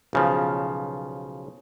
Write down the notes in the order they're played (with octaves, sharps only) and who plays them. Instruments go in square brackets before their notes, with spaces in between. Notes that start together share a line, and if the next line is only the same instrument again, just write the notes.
[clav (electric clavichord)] B1 C#3 F3